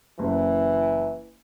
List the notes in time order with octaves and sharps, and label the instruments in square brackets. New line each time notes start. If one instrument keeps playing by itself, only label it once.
[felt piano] F#1 [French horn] E3